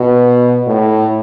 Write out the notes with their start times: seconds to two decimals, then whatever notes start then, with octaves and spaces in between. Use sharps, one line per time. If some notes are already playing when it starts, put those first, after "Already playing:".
Already playing: B2
0.67 A2